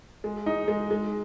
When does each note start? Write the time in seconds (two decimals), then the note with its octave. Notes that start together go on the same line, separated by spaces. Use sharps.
0.24 G#3
0.46 D#4
0.68 G#3
0.91 G#3